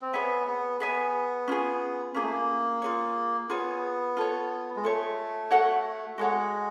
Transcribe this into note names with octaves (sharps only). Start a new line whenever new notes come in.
C4
B3 G#4 C#5 E5 G#5
B3
B3 G#4 C#5 E5 G#5
C#4 F4 G#4
A#3 C#4 F4 G#4
A3
A#3
F4 G#4 C#5
B3 F4 G#4 C#5
F4 A4 C#5
G#3
A3 F4 A4 C#5
F#4 A4 C#5 F#5
G#3 F#4 A4 C#5 F#5